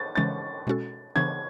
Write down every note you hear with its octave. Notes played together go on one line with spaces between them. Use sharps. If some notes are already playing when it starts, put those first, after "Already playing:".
Already playing: A6
C#3 E3 G#3 C#4 A6
B2 G#3 C#4 F#4 A4
C#3 E3 B3 D4 G#6